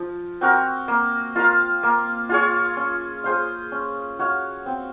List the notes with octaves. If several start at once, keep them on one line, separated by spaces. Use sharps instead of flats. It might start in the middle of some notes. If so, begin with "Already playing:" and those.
Already playing: F3
C4 F#4 A#4
A#3
F4 A#4 F5
A#3
F4 G#4 C#5
C#4
G#4 C5 F5
C#4
F#4 C#5 F5
C4